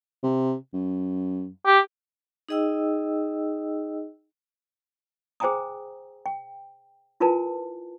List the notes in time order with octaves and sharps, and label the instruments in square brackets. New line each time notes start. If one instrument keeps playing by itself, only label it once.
[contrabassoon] C3
F#2
[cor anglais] G4
[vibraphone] D#4 G#4 D#5 G5 E6
[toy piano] G#4 C5 G5 G#5 A#5 D#6
G5
E4 F4 A#4 B4 G#5 A5